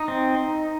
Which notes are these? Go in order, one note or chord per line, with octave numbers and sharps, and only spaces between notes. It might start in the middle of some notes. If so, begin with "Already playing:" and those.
Already playing: D#4
C4